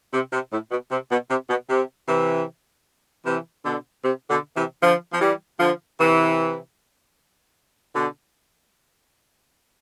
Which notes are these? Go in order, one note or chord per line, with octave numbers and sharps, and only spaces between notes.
C3
C3
A2
B2
C3
B2
C3
B2
C3
C3 E3
C3 E3
B2 D3
C3
B2 D3
C3 E3
D3 F3
F3
E3 G3
D3 F3
C3 E3
B2 D3